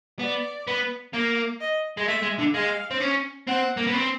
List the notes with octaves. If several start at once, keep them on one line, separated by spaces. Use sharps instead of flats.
B3 D5
B3
A#3
D#5
G#3
A3 E5
G#3
D3
G#3 F5
C4
C#4
C4 F#5
A#3
B3
C4